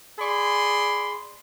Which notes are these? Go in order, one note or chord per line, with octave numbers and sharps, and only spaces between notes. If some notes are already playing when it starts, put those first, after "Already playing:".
G#4 D5 B5 C6